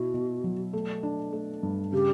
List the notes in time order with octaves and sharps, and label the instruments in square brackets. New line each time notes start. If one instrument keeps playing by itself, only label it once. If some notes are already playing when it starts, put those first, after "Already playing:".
Already playing: [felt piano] B2 E4 [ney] F#4
[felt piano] B2
F#3
A3
D4
A3
G2
[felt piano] C#3 [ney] G4